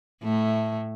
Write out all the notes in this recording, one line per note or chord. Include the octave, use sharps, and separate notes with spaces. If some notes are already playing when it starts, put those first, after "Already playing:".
A2 A3